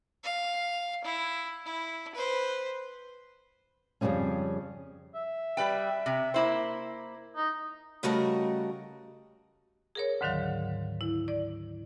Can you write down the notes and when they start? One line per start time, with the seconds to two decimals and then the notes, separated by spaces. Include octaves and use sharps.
0.24 F5
1.05 E4
1.66 E4
2.15 B4 C5
4.01 F2 C#3 E3 G3 G#3 C#4
5.15 E5
5.57 G3 B4 G5
6.06 C3
6.34 A#3 E4 C5
7.36 D#4
8.03 C#3 G3 A3 F#4 A#4 D#5
9.95 G#4 A#4 C#5
10.21 D2 G#2 D3 D#3 F#3 F5
11.01 E4
11.28 D5